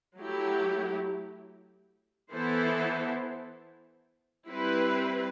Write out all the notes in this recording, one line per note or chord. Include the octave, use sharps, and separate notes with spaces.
F#3 A3 E4 G4
E3 B3 E4 A4 C5
G3 C4 E4 B4